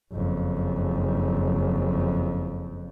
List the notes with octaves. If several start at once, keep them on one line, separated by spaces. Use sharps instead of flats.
F#1 F2